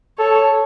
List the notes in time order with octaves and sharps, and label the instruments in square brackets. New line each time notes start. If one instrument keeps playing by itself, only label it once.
[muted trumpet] A4 [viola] C#5